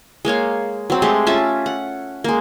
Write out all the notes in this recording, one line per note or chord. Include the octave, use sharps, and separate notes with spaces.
G#3 A#3 C#5 F5
F#3 C4
G#3 A3 G4 C6
C#4 F4 E5 A5
F#5
G#3 A#3